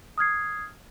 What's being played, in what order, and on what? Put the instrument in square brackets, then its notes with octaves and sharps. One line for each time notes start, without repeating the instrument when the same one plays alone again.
[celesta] D#6 F6 G#6 C7